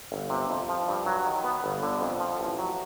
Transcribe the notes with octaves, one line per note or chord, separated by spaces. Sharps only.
G1
C3
F2
F3
G2
F#3
D#3
B3
G1
D3
F2
F3
A1
F#3